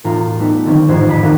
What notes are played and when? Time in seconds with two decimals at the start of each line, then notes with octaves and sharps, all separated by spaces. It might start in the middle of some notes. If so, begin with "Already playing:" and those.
0.04 E1 A2 F4 A#5
0.39 G3 A3 B3 D#4
0.65 D3 D#3 F3 G3 C4 C#4
0.88 A1 F2 G#2 C5 G#6
1.07 C#2 B5
1.23 D#2 A2 C#4 F#5 A#6 D#7